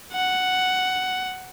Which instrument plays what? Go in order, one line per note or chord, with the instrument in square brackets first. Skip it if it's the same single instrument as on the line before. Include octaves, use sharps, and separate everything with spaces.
[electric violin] F#5